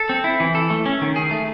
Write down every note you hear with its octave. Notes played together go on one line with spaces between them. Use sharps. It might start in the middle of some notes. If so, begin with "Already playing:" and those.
Already playing: A4
C4
E4
E3
A4
A3
C#4
D#3
G#4
A3